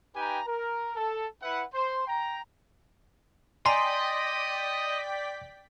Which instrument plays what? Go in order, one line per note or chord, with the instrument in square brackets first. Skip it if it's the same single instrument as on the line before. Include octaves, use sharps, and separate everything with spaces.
[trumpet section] D#4 G4 B4 G5 G#5 A#5
A#4
A4
E4 B4 F#5
C5 C6
G5 A#5
[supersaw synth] D5 G5 B6 [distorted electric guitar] D#5 [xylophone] G#5 A#5 [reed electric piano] C6